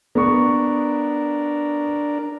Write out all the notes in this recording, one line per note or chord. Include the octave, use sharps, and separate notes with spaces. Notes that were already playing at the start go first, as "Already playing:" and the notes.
B3 D4 A#4 C#6